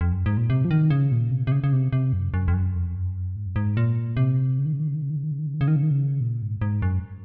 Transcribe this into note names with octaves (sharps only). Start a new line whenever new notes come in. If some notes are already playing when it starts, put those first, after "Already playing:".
F2
F#2
G#2
A#2
C3
F3
D#3
C#3
A#2
C3
C3
C#3
C#3
C3
C3
F#2
F#2
F2
F#2
F2
F#2
G#2
F#2
G#2
A#2
C3
C#3
D#3
C#3
D#3
C#3
D#3
C#3
D#3
C#3
D#3
C#3
D#3
C#3
D#3
C#3
D#3
C#3
D#3
C#3
A#2
G#2
G#2
F#2